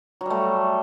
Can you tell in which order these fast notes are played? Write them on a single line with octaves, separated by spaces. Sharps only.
F#3 G3 A3